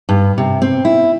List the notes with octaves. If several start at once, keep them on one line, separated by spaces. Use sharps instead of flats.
G2
C3
C4
E4